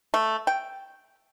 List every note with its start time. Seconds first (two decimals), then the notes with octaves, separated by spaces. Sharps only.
0.14 A3
0.47 G5